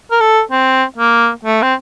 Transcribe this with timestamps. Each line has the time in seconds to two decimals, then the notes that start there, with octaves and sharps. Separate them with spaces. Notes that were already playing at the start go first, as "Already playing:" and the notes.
0.11 A#4
0.20 A4
0.51 C4
0.98 A#3
1.45 A3
1.62 C4